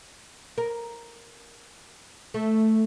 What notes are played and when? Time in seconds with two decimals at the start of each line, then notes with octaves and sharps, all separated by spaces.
0.58 A#4
2.34 A3